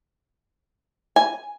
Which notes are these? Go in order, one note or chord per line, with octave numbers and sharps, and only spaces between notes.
G#5